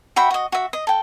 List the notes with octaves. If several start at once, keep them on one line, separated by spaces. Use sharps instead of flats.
F#4 E5 G5 B5
F#4 D#5
F#4 E5
D#5
A4 G5